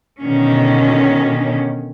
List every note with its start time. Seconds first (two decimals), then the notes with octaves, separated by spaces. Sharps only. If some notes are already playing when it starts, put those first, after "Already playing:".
0.22 B2 D3 D#3 C#4